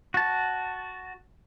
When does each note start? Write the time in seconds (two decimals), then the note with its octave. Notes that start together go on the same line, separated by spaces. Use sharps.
0.14 F#4 A5